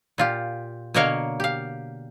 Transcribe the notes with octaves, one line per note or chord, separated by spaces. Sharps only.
A#2 F4 G4
B2 D3 A#3 A#4 C#5 F5
G4 F5